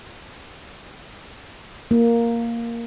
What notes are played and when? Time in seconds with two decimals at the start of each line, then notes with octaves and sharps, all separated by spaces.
1.91 A#3